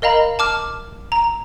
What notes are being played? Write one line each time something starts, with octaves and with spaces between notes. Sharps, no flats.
A#4 D#5 F5 A#5 B5
A5 D6 F6
A#5